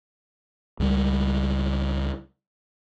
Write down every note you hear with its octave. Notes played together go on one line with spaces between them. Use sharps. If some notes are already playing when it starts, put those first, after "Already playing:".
C#2 G3